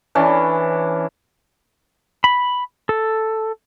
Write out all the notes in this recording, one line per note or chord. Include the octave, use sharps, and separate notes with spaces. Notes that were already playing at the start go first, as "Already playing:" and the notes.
E3 C#4 D4
B5
A4